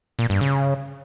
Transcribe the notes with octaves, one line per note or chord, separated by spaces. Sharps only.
A#2
G2
C#3